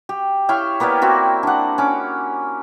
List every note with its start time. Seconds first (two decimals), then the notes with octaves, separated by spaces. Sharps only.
0.09 G4
0.49 E4 C#5 F5 G5
0.80 A#3 B3 G4 D5
1.02 C4 E4 F#4
1.43 D4 F#5
1.78 C#4 D6